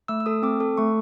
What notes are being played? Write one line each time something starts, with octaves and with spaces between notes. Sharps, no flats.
A3 E6
E6
A4 D#6
C4 D6
A4
A3 C#6